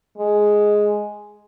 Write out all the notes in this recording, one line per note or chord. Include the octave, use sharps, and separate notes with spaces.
G#3